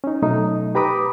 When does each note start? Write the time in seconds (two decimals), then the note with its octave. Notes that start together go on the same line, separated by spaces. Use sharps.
0.04 C#4 D#4
0.22 B2 F#3 A3 D#4
0.75 G4 B4 A#5 B5 D6 D#6